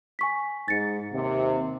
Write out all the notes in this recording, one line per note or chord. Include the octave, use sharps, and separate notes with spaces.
G#5 C#6 B6
G#2 A6 C#7
D#2 C3